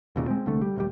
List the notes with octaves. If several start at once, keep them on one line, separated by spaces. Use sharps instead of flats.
E1 D#2 A#2 C#3
G#3 C4
C2 D3 A3
G3
A#1 D#2 G3